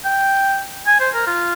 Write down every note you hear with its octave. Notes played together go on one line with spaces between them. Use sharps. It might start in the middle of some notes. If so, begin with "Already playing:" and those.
G5
G#5
C5
A#4
F4